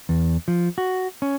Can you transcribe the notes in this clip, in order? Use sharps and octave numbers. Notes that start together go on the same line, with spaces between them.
E2
F3
F#4
C#4